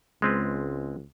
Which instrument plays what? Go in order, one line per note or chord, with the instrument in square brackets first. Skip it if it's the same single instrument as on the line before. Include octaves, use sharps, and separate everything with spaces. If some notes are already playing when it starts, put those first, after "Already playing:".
[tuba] C#2 [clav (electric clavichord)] G#3 C4 B4